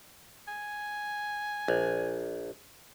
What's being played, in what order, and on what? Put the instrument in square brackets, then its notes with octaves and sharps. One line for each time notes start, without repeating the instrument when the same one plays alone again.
[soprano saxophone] G#5
[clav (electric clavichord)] A#1